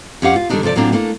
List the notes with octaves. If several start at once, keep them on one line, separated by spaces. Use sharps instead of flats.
F2 C#4 G4 F5 F#5
F4
D3 D#3 G3 A3 D4 D#4
C3 F3 A4 D5
A2 F#3 A#3 C4 D4 F4
A3 A#3 D4 E4